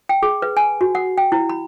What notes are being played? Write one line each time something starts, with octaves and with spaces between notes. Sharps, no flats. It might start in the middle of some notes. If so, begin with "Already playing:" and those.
G5
G#4
B4
G#5
F#4
F#5
G5
E4
B5